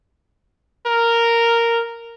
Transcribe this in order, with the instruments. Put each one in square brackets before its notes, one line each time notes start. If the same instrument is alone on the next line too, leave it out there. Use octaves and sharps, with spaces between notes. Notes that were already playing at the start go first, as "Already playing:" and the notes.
[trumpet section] A#4